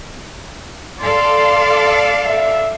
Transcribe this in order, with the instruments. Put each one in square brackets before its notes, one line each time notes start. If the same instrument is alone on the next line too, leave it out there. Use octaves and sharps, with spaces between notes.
[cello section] A4 D5 F5 [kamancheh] C6
[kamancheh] E5